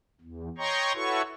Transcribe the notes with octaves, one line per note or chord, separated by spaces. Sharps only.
E2
C#5 D#5 G5 A#5 C6 C#6
E4 F#4 A4 B4 C#5 C#6